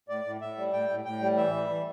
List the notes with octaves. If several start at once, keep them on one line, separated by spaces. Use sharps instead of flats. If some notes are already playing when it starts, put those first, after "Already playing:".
A2 D5
A2
A2 E5
G3
A2 G5
A2
A2 G5
G3
E3 E5
G3
E3